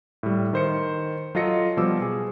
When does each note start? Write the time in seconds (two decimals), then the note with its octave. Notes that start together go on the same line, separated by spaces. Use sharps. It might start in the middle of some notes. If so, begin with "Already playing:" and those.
0.23 A2 G3
0.53 D#3 C5 C#7
1.35 F#3 F4 A4 D#5 A#6 C#7
1.77 B2 F3 G3 D6 E6
2.02 G#4